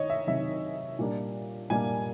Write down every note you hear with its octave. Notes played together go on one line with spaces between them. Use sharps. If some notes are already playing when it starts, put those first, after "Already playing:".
Already playing: D#3 C#5 D#5
E5
C3 D#3 F#3 E5
A#2 G3 A#3 D4
A#2 G3 A#3 D4 G#5